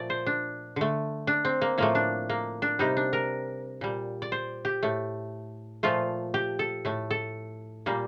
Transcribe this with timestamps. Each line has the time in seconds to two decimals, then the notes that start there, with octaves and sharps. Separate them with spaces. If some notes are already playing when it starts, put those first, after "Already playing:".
Already playing: A#2 F3 A3 D5
0.10 C5
0.26 D4
0.76 D3 A3
1.27 D4
1.45 C4
1.61 A#3
1.78 A2 F3 A3 A#3
1.95 D4
2.29 A#3
2.62 D4
2.79 C3 G3 D#4
2.97 D4
3.13 A#4
3.81 A#2 G3
4.22 D5
4.32 C5
4.65 G4
4.83 A2 A3
5.83 A#2 F3 A3 F4
6.34 G4
6.59 A4
6.85 A2 A3
7.11 A4
7.86 A#2 G3 A#3